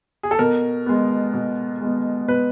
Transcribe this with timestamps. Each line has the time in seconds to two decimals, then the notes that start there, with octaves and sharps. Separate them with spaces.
0.23 G#4
0.31 A4
0.39 B2 A#4
0.86 G#3 B3
1.34 B2
1.81 G#3 B3
2.28 B2 B4